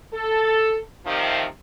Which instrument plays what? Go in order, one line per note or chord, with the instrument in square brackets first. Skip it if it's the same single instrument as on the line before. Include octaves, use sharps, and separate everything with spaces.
[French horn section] A4
C3 D#3 F3